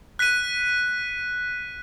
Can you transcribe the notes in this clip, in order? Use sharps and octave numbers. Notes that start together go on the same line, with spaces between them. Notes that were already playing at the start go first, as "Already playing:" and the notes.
F#6 B6 D#7